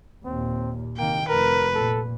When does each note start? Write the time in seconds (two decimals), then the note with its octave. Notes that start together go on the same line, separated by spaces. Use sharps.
0.25 D#2 A#2 C4
0.98 C3 D#3 A#3 G5
1.28 F1 A#4 B4
1.74 A#2 A4